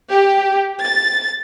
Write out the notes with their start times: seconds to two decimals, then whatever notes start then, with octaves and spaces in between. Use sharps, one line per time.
0.11 G4
0.83 A6